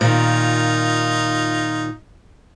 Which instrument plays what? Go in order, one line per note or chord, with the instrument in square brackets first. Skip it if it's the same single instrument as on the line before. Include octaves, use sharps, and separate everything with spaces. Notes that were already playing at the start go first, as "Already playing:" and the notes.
[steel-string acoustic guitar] A#2 D#3 [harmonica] D#4 F4